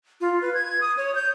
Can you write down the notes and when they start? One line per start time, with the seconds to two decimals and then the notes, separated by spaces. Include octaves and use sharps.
0.21 F4
0.42 B4
0.54 G#6
0.81 D#6
0.97 C#5
1.15 G6